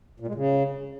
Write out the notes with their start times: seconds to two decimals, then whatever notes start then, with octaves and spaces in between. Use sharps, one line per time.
0.20 A#2
0.27 G#3
0.35 C#3